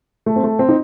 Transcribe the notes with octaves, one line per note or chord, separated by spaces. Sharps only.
A3
C4
A3
C4
D#4